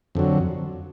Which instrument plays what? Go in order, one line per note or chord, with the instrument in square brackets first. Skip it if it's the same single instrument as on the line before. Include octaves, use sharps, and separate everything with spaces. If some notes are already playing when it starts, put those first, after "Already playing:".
[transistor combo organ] F2 D3 F#3